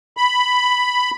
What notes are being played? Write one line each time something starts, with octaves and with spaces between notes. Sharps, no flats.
B5